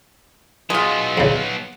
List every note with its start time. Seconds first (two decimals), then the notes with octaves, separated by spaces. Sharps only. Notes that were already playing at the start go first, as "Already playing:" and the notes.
0.70 F#3 G#3 B3 F4
1.18 E2 C#3